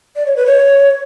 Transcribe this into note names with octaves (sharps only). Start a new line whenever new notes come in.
D5
C#5
B4
C#5